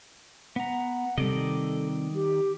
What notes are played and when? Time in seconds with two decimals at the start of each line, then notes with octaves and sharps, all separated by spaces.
0.56 B3 F#5 A#5
1.18 C3 D#3 G3 A4 D5 D#5
2.14 G4